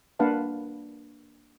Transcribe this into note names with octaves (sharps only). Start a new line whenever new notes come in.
A#3 D4 B4 F5 F#5 A5